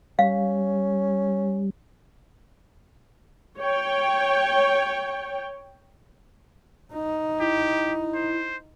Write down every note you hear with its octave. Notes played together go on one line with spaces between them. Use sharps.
G3 C#4 F5
C#5 G5
D#4
E4 G4
C5